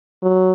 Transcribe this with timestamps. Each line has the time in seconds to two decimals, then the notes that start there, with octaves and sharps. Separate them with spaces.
0.23 F#3